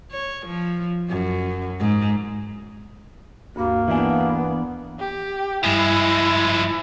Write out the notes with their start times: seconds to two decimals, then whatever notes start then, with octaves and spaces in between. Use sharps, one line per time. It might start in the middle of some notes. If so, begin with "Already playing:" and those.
0.12 C#5
0.47 F3
1.09 F#2
1.80 G#2
3.56 D2 G2 A#3 F#4
3.88 E3 B3 D4 E5 F5 G#5
4.99 G4
5.64 G2 F3 G#3 E4 G#5